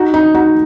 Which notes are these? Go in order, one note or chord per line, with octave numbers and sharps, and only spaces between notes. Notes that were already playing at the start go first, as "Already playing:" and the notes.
Already playing: D#4 F#4
D#4
D#4 F#4